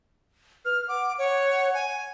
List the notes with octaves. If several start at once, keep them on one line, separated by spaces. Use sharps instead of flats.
B4 F6
F#5 D6
C#5 F#5
G#5